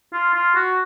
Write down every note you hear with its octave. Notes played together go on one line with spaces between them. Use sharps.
F4
F4
F#4